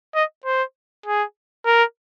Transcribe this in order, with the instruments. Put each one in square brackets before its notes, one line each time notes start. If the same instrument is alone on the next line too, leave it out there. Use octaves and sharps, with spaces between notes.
[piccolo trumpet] D#5
C5
G#4
A#4